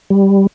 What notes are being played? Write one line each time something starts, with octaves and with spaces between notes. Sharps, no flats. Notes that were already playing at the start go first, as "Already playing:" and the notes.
G3